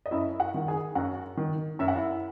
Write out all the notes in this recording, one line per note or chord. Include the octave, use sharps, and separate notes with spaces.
D#5
F#2 E4 E5
F#4 F#5
D#3
G#4 G#5
F#2 F#4 F#5
D#3
F#2 E5
F#5
E4 E5